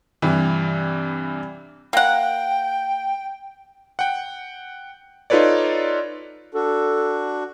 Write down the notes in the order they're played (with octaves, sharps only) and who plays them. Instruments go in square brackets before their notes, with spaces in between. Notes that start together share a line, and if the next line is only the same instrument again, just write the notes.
[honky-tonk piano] G2 C3 E3
[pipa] A#3 F#5 [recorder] G5
[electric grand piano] F#5 G5
D#4 F4 A4 B4 C#5 D5
[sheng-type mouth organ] D4 F#4 [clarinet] A4